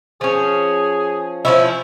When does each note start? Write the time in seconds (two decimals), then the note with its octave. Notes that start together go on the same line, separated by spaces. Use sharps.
0.21 F3 C#4 G#4
1.45 F3 C#4 E4